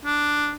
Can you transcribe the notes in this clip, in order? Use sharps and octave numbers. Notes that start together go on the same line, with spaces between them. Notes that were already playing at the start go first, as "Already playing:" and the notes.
D4